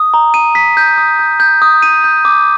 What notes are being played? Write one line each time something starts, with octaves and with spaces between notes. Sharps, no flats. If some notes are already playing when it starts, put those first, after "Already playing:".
Already playing: D#6
A#5
D#7
B6
G6
D#6
G6
G6
D#6
D#7
G6
D6